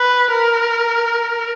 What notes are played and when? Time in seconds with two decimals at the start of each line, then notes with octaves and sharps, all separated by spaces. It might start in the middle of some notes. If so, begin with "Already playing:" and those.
Already playing: B4
0.32 A#4